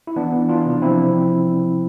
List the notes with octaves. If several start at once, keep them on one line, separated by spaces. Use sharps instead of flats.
E4
E3 B3 D4
E3
E3 D4 F4
C3
F3 C4 E4